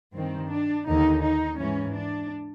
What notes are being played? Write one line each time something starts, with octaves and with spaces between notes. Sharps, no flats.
G2 D#3 C4
D4
D#2 D3 D#4
D#4
G#2 E3 C#4
D4